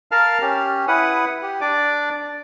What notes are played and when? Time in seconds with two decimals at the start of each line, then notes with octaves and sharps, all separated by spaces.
0.11 A#4 F5 A5 F6
0.42 C#4 G4
0.88 E4 B4 F#5 D#6
1.42 G4
1.61 D4 D5 D6